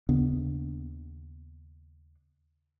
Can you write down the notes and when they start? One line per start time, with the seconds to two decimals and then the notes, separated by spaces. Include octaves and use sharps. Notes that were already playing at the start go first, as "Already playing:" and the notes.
0.09 D#2 C#3 B3 D4